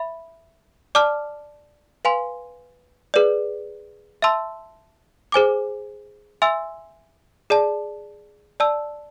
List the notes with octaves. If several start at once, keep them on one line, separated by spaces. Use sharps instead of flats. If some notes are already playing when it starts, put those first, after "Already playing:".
Already playing: E5 B5
D5 A5 D6 F6
B4 F5 G#5 C6
G#4 B4 D5
E5 A5 C6 E6
G#4 C5 G#5 D6
E5 G#5 C6 E6
G#4 D5 A5
D5 A5 E6